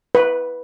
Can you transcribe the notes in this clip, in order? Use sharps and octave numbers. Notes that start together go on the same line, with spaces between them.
B4